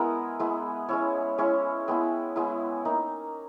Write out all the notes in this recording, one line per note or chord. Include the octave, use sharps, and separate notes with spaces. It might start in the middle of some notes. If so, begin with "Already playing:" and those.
Already playing: G#3 B3 E4 G#4 A#4
G#3 B3 E4
G#3 C#4 E4 C#5
G#3 C#4 E4 C#5
G#3 B3 E4 G5
G#3 B3 E4
A#3 D#4